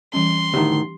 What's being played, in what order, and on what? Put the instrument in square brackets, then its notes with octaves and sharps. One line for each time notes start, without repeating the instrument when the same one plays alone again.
[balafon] E3 G3 C#4 [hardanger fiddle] C6
[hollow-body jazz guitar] D2 A2 D#3 [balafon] G4